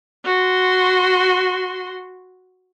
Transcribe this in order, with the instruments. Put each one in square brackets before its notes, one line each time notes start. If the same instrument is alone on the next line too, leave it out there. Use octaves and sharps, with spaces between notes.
[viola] F#4 C6